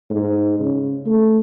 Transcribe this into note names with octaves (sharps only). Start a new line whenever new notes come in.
G#2
C#3
A3